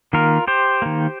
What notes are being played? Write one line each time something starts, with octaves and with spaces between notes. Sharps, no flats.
D#3 A#3 F4 A#4
G4 C5
D#3 A#3